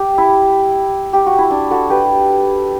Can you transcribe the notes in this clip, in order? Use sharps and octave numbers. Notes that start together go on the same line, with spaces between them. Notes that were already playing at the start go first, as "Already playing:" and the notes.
Already playing: G4
E4
G4
F#4
E4
D4
F#4 A4
G4 B4